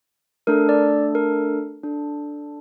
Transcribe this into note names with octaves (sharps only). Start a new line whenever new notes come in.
A3 D4 A4 A#4
D5
A#4
D4 A4